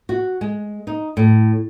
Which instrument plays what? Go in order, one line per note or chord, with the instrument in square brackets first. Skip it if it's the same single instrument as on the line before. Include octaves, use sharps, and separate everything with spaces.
[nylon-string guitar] F#4
G#3
D#4
A2